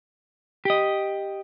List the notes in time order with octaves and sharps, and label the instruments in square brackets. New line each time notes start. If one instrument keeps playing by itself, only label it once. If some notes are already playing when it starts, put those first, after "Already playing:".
[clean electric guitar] G4 D#5